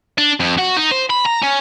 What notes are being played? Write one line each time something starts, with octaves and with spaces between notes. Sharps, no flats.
D4
F2
F#4
D#4
C5
B5
A#5
C#4